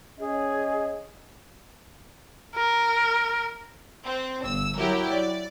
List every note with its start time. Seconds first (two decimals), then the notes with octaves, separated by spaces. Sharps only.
0.20 C#4 G#4 D#5
2.56 A#4
4.04 C4
4.45 G1 E6
4.78 F#3 E4 G4 A#4
5.08 D5